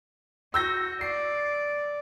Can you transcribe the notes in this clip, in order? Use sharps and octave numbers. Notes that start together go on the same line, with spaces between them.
F#4 E6 G6 A#6
D5 C7